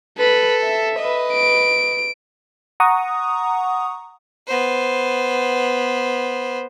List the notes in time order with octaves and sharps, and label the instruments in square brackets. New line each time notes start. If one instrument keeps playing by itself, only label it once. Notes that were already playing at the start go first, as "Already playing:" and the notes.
[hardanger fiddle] A4 [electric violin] B4 B5
[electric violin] E5
[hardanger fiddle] B4 D#5
[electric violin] D7
[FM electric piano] F#5 A#5 C#6 D#6
[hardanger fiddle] B3 C5